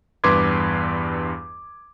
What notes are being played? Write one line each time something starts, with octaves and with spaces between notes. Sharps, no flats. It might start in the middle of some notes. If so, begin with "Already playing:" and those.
E2 G2 B4 C6 D6 G#6